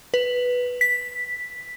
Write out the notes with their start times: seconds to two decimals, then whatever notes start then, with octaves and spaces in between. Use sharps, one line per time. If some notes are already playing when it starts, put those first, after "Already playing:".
0.14 B4
0.81 B6